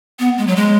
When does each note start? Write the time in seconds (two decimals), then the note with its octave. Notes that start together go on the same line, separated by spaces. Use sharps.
0.19 B3
0.38 G#3
0.47 F#3
0.56 G#3